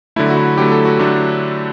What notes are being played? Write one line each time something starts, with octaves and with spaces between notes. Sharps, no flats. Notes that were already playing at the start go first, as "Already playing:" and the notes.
D3 F#3 A3 E4
F#4
E4
D3 F#3 A3 G4
A4
F#4
D3 F#3 A3 D4